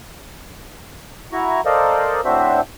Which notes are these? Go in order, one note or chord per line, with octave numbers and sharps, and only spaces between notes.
E4 F#4 A#5 C#6
A4 A#4 C5 D5 D#5 F5
A2 C4 D4 F#4 C5 E5